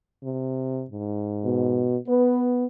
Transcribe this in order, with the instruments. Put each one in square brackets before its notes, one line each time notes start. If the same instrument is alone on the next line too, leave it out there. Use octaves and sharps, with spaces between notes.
[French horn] C3
G#2
[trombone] B2
[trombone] B3 [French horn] B4